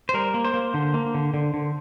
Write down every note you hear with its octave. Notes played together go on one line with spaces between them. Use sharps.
C5
G3 A#4
A#3
C5
A#3
D3
A#3
D3
D3
D3